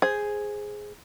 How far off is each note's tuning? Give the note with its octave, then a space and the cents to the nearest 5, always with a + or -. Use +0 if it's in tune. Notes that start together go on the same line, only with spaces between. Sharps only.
G#4 +0 C5 +0